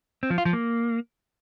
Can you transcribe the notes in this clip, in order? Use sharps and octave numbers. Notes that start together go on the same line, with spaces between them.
C4
F3
F4
F3
A#3